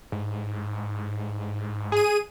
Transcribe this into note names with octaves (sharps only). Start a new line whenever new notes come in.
G#2
G#4 D#7